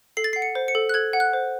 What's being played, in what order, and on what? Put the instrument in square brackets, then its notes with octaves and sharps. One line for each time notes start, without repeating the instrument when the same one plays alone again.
[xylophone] A4 C7
A6
C7
F#5
C#7
C5
C#7
A4
F#6
A4 G#6
F#5
F#6
C5